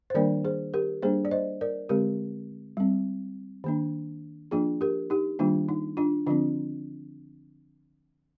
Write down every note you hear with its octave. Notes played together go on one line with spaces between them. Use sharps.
C5
D#3 G3 A#3 D4 A#4 D5
G#4 C5
G4 A#4
G3 A#3 D4 G#4 C5
D5
C5 D#5
A#4 D5
D3 G#3 C4 G4 A#4
G3 C4
D#3 A#3 D4
F3 A#3 D4 F4 G#4
G4 A#4
D#4 G4
D#3 G3 A#3 D4 F4
D#4
D4 F4
D3 F3 C4 D4 F4